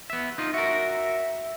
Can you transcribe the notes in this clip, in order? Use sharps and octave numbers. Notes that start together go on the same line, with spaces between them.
B3 E5
D#4 F4
F#4 A#4 E5